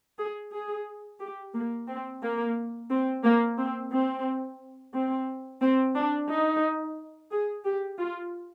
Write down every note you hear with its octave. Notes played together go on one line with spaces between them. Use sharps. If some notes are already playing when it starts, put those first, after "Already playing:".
G#4
G#4
G4
A#3
C4
A#3
C4
A#3
C4
C4
C4
C4
D4
D#4
G#4
G4
F4